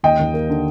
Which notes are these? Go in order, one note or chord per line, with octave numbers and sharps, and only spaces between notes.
D#2 D#5 G5
D#2
A#3
D3